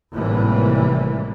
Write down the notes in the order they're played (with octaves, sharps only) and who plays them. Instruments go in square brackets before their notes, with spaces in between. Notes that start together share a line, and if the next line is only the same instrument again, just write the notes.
[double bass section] G#1 A2 C3 E3 G3 A#3